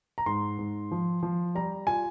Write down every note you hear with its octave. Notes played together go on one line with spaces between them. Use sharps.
A#5
G#2 C6
G#2
F3
F3
G3 A#5
F4 G#5